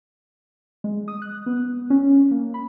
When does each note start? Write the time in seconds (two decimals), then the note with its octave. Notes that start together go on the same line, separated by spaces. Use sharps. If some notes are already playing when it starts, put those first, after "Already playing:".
0.84 G#3
1.08 D#6
1.22 F#6
1.46 B3
1.90 C#4
2.31 A#3
2.54 B5